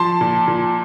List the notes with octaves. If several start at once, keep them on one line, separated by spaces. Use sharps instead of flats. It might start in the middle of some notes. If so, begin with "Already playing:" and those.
Already playing: F3 A5 C6
A#2
A#2